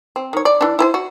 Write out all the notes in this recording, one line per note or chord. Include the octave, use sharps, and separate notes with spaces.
C4
D#3 C#5
D5
E3 D4
E4 B4 C5
F#4